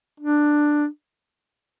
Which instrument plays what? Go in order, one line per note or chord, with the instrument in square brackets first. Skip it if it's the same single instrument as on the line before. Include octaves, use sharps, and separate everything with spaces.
[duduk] D4